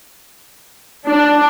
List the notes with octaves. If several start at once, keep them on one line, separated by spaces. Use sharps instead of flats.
D4